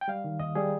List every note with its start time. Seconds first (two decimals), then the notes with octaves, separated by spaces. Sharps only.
0.01 G5
0.08 G3 F5
0.24 D#3
0.40 D#2 D#5
0.55 G3 G#4